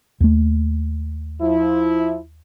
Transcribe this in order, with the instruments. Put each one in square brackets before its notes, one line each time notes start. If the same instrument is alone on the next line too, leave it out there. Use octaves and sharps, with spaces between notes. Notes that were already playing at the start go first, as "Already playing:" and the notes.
[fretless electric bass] D#2 A3
[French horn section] F3 E4